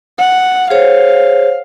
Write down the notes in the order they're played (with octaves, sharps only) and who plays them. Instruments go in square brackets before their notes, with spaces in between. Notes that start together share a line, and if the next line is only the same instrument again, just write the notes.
[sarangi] F#5
[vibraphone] G#4 C5 C#5 [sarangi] F5